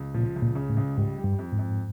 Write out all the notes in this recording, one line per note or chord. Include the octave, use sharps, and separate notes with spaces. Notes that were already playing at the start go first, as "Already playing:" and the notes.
Already playing: C#2
A#2 F3
C#2
A#2
C#3
A2
C#2
G#2 G3
G3
G2
F2
G#2
F2